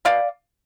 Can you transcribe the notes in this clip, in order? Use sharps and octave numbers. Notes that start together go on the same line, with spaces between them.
B2 D5 F5